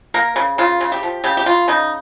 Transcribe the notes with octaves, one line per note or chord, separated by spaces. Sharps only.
A#3 A#4
C#3
C#3 F4
C#3
G4
F3
C#3 G4
G4
C#3 F4
C#3 D#4